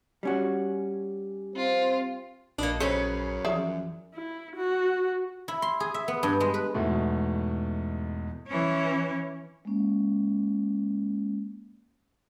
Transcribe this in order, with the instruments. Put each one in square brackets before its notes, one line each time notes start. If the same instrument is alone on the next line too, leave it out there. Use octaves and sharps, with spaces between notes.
[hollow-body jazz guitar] G3 C#4 F#4
[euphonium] C4 [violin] F4
[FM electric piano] A#1 B5 C#7 [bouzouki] A#3 D#5 [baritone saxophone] D4
[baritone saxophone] F#2 [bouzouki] C#3 C#4 B4 [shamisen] A4 C5
[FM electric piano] E3 F3 [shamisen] G#4 D5 E5
[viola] E4
F#4
[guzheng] E4
C6
G#4
E5
B3
G2
G#3
B4
[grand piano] E2 G#2 B2 A3
[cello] E3 C#4
[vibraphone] G#3 A#3 C#4